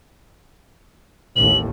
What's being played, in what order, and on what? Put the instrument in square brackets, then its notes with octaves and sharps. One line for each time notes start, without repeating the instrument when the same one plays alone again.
[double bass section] A1 D#2 [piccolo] F#7